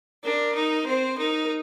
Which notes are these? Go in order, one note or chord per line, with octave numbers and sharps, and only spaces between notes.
D4 A#4
D#4
C4 C5
D#4 A#4